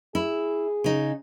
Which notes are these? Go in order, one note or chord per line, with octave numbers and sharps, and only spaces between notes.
E4 G#4
C#3 D#4